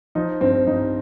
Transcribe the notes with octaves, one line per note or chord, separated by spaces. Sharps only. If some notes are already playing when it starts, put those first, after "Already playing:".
F3 D#4
G2 C4
G2 D#4